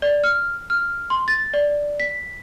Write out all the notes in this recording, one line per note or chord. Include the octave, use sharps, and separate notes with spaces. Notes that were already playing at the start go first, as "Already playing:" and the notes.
D5
F6
F6
C6
A6
D5
B6